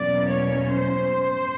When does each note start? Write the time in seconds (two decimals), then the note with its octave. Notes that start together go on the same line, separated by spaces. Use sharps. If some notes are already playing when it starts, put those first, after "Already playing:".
Already playing: E2 B2 F#3 A#3 C#4 D5
0.31 C#5
0.76 C5